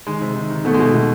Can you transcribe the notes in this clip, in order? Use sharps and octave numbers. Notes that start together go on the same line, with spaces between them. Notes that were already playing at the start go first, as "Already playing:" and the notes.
D#3 G#3
C3
D#3
D#3
B2 A3
G#3
B2 A3
B2